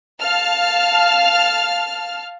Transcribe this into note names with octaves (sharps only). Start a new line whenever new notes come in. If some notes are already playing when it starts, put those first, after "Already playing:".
F5 A5 F6